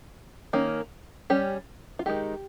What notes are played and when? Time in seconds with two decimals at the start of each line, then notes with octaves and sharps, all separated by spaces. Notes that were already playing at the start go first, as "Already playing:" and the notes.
0.53 D#3 A#3 C#4
1.30 G3 C#4 G4
1.99 F4
2.06 D#3 G#3 D#4 G4